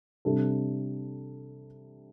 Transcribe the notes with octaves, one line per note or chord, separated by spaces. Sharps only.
C3 G3 D4 A4